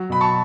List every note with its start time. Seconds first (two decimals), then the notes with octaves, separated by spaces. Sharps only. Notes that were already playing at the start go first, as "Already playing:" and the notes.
Already playing: F#3
0.10 B2 B5
0.21 A5 C#6